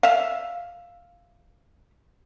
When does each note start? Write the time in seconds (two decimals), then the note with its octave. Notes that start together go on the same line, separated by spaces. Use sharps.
0.03 E5 F5